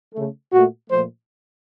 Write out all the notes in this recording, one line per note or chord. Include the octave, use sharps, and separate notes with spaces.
C#3 A3
A#2 A3 F#4
A#2 F3 A3 C5